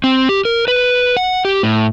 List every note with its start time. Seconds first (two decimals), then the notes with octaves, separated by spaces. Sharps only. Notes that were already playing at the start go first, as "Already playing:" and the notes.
0.04 C4
0.29 G4
0.45 A#4
0.68 B4
1.17 F#5
1.45 G4
1.63 A2